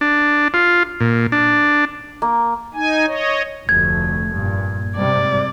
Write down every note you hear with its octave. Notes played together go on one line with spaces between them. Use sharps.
D4
F4
A#2
D4
A#3
D#4 G#5
C#5 D#5
F1 D2 A3 G#6
G2 A#2
G#2 C3 G3 D5